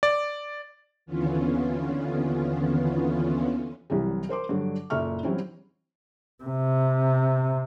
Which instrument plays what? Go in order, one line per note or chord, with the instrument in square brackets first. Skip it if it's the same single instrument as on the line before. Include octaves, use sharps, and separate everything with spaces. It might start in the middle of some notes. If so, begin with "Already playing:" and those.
[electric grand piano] D5
[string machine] D#2 D3 E3 B3 C#4 F4
[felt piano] C2 E3 F#3 G3
A#4 C5 C6 D6
G2 D3 F#3
F#1 A#2 A4 E5 C#6 F6
E3 F#3 G3 C4 C#4 E4
[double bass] C3